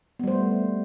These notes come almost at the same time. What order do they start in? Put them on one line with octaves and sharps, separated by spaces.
B3 G3 C5 A3